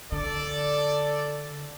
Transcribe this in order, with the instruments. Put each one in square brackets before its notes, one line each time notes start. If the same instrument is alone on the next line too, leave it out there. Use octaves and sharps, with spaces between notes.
[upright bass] D3 [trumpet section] A4 D5